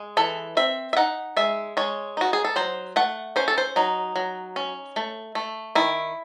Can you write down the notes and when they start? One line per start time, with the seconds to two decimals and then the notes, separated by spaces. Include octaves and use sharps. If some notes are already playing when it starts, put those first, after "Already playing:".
Already playing: G#3
0.17 E3 A4
0.57 C4 E5
0.93 E5
0.97 D#4 F#5
1.37 G#3 E5
1.77 G#3 C#5
2.17 D#4 F#4
2.33 G#4
2.45 A4
2.56 F#3 C5
2.96 A3 F#5
3.36 C#4 C5
3.48 A4
3.58 C5
3.76 F#3 D#4
4.16 F#3
4.56 C#4
4.96 A3
5.35 A3
5.75 D#3 E4